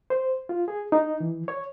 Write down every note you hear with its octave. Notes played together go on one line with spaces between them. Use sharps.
C5
F4
G#4
D#4
E3
C#5